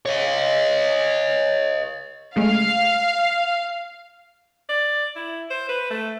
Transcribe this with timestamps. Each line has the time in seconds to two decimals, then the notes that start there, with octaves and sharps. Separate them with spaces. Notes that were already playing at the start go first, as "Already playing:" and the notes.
0.06 C#5 D#5
2.36 C#3 G#3 A3 F5
4.70 D5
5.16 E4
5.51 C5
5.69 B4
5.91 A3